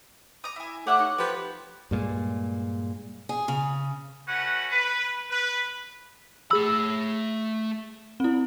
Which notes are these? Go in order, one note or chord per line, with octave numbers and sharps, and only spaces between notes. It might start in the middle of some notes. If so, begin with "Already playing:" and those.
A#5 D#6
E4 G#5
A3 G4 C#5 E5 F#5 E6
D#4
F3 G4 B4 C#5
G2 A#2 G#3
G#4
C#3
A3 C#4 F#4 B4 F#5
B4
B4
A3 G#4 B5 E6
C4 E4